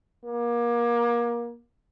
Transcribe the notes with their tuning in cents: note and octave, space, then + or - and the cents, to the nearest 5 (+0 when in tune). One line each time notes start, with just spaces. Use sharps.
A#3 +30